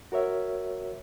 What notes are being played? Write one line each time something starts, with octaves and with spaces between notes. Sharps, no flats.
F#4 A#4 C#5 E5